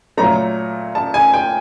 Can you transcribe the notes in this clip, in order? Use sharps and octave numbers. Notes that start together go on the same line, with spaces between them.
A#2 F#3 A3 A#5
A5
G#5
G5